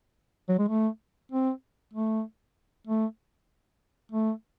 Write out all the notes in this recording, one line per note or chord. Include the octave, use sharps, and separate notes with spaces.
F#3
G#3
A3
C4
A3
A3
A3